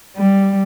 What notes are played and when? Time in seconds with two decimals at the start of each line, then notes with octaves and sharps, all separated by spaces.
0.15 G3